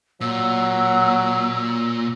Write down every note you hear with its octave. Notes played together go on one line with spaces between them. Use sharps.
A#2 F#3 E6